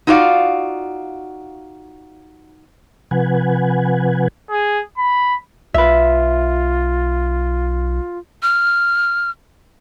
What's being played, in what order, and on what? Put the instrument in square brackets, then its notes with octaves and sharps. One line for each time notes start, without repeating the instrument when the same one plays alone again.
[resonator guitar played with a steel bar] D#4 F4 F#4 D5 F5
[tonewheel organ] C3 F3 B4 F#5 G#5
[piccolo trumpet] G#4
B5
[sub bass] B1 [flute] F4 [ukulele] B4 E5
[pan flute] F6